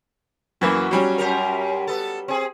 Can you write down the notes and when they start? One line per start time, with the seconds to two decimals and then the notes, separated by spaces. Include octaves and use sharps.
0.61 F#2 E3 A#3 F#4
0.91 F#3 G3 C#4
1.18 F#2 G4 A#4
1.87 B3 A4
2.28 C4 G#4